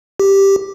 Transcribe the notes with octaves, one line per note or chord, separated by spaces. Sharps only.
G4